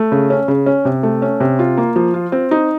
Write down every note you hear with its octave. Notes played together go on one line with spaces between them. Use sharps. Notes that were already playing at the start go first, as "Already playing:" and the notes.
Already playing: A3
C#3
C#4
C#3
C#4
C3
A3
C#4
C3
F4
A#3
F3
F4
C4
D#4